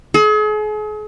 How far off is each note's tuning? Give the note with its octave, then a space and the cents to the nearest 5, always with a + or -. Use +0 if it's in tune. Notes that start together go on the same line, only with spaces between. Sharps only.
G#4 +40